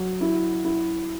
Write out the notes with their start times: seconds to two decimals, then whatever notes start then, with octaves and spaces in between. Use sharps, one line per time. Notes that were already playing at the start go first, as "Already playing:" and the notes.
Already playing: F#3
0.21 E4
0.65 E4